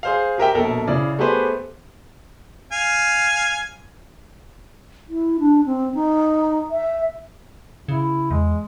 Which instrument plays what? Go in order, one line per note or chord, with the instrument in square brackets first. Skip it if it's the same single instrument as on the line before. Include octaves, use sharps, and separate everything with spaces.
[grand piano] G#4 C5 F5
G4 A#4 E5 G5
A#1 B2 A4 A#4 E5
C#3 E4 D5
A3 B3 G4 G#4 B4 C5
[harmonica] F5 G#5
[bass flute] E4
D4
C4
D#4
E5
[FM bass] C#3 [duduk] E4
[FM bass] E2 [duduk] G#3